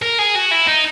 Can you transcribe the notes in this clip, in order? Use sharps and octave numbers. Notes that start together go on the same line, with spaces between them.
A#4
G#4
F#4
E4
D#4